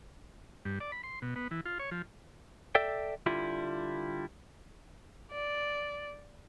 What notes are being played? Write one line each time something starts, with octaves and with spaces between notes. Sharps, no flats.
G2
D5
B5
C6
B2
B3
E3
F4
C#5
F3
A4 D5 E5 G5
D3 G3 E4 F4
D5